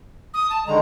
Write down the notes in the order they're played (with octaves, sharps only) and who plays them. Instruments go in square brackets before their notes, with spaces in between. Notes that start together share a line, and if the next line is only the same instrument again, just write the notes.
[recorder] D#6
A5
[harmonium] D3 D#3 G#3 [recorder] A#5